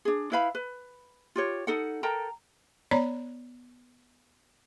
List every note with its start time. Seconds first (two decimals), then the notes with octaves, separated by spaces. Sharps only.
0.05 D4 G#4
0.32 E4 B4 F5 B5
0.55 B4
1.36 F4 G4 C#5
1.67 D#4 A4 F#5
2.03 A4 A#4 G5 A#5
2.91 B3 C#5 D5 A#5 B5